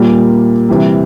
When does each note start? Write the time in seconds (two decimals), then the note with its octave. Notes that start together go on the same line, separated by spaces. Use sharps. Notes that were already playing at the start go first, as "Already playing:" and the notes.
Already playing: A#2 G3 A#3
0.69 C3 E3 G3